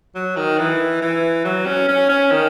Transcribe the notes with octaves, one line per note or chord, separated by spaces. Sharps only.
F#3
D#3
E3
E3
F#3
C#4
C#4
C#4
D#3